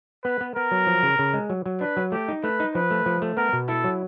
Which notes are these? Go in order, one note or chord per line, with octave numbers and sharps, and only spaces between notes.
B3 B4
B3
B3 A#4
F#3
F3
C#3
C#3
G#3
F#3
F#3
D4 B4
F#3
A3 G4
D#4
A3 B4
D#4
F3 B4
A3
F3
A3
B3 A#4
B2
E4 A4
F#3